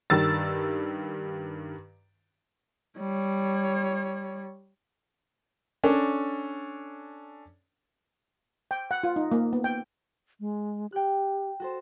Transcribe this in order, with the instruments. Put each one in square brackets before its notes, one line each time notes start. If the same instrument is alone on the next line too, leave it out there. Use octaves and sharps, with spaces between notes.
[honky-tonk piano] G2 D#3 E6 A6
[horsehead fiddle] G3 C#5
[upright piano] C#4 D4 A4
[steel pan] G5
F#5
F4
D#4
A#3
B3
G5
[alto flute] G#3
[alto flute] G4 [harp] G5 F#6
[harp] F#4 A4 C5